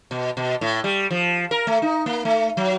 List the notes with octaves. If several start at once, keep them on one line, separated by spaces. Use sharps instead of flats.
B2
B2
A2
G3
F3
A#4
A3
D#4
A#3
A3
F#3